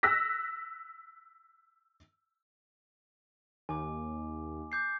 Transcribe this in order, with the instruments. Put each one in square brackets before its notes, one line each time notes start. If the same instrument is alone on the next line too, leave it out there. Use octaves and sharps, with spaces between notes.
[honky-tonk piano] E6 F#6 A#6 B6
[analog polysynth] D#2 [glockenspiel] G#5 D6
[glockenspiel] D6 G6 C7